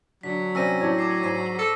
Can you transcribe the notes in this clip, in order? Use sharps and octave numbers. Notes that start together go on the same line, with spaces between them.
D3 F#3 B6
C3 G3 C#4 E6 A#6 D#7
A2 D4 G4 C#5
C#6 D6 C7
G#2 C7 D#7
A4